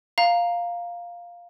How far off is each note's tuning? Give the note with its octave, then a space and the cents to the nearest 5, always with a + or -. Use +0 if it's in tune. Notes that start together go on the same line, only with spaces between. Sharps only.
F5 +0 A#5 +0